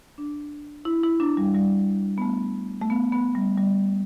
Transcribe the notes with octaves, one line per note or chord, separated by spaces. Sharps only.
D4
E4
E4
D4
G3
G3
B3
A3
A3
B3
B3
G3
G3